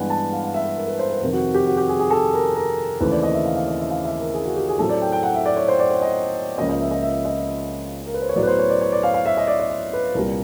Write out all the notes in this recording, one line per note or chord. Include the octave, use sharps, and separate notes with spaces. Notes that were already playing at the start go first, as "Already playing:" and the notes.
Already playing: G2 E3 G#3 B3 B4 F#5 G#5
A5
F5
F5
E5
B4
A#4
B4
C5
B4
F2 C3 D#3 A#4
F#4
G4
F#4
G4
G#4
G#4
A4
A#4
A#4
D#2 C#3 E3 A3 C4 B4
D5
D#5
E5
F5
F5
D#5
E5
F5
E5
A#4
G#4
F#4
G4
G#4
A2 F#3 A3 C4 A4
D5
G5
G5
F#5
E5
D5
C#5
C5
D5
C#5
D#5
C#2 C#3 F3 A#3 D#5
D#5
E5
D#5
E5
D#5
A#4
B4
C5
C#5
A2 F#3 B3 D5
B4
C5
C#5
D5
C#5
D5
F5
F5
E5
D#5
D5
D5
C#5
B4
C2 A#2 G3 A#4